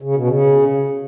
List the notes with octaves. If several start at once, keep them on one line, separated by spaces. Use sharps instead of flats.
C#3
B2
C#3